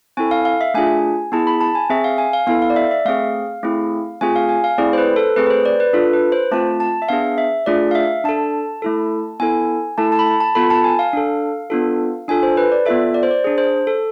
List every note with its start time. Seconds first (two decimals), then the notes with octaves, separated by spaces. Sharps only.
0.17 C4 E4 A4 G#5
0.31 F5
0.45 F5
0.61 E5
0.74 A3 D4 F4 G#4 G#5
1.32 B3 E4 G#4 A5
1.47 B5
1.61 A5
1.75 G#5
1.90 C4 G#4 E5
2.04 F5
2.18 G#5
2.33 F5
2.47 B3 E4 A4 F5
2.62 F5
2.70 D5
2.76 E5
2.91 E5
3.05 A3 C4 G#4 F5
3.63 A3 C4 E4 G#4
4.21 A3 C4 F4 G#4 G#5
4.36 F5
4.49 G#5
4.64 F5
4.78 A3 C4 E4 G#4 D5
4.93 C5
4.98 B4
5.16 A4
5.36 A3 C4 G#4 B4
5.47 B4
5.50 C5
5.65 D5
5.80 B4
5.93 D4 F4 A4
6.13 B4
6.32 C5
6.51 A3 C4 F4 A5
6.80 A5
7.02 E5
7.09 B3 D4 G#4 F5
7.38 E5
7.66 A3 D4 F4 G#4 D5
7.91 F5
7.95 E5
8.24 D4 A4 A5
8.82 A3 E4 A4
9.40 B3 E4 A4 G#5
9.98 A3 E4 A4 A5
10.12 A5
10.19 B5
10.26 A5
10.41 A5
10.55 B3 F4 A4 B5
10.70 A5
10.84 G#5
10.99 F5
11.13 D4 A4
11.70 B3 D4 F4 A4
12.28 D4 F4 A4 G#5
12.43 C5
12.57 B4
12.72 D5
12.86 B3 F4 A4 E5
13.14 D5
13.23 C5
13.31 D5
13.44 D4 G#4
13.58 C5
13.87 A4